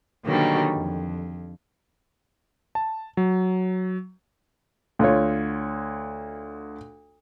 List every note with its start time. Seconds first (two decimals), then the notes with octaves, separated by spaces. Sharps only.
0.24 B2 D3 D#3 F#3 G3 A#3
0.75 F2
2.75 A5
3.17 F#3
4.99 D2 F4 C#5